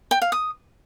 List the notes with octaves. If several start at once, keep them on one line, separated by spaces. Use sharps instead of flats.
G5
F5
D#6